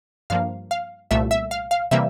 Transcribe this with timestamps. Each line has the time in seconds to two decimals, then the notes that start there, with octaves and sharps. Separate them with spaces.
0.30 G2 F3 A#3 F5
0.71 F5
1.11 C2 A#2 A3 E5
1.31 E5
1.51 F5
1.71 F5
1.91 C3 E3 G3 A#3 E5